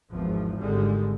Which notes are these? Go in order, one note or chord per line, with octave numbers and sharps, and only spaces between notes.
G#1 E2 G#2 F3
G#1 D3 G3 G#3